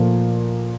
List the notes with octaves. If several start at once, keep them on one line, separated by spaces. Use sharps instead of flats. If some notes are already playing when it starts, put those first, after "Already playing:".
Already playing: A#2 F3 A3